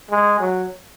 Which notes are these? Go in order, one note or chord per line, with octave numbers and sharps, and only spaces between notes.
G#3
F#3